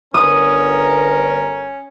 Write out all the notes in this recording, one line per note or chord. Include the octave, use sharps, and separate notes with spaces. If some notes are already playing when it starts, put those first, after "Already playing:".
G1 C#4 A#4 D#6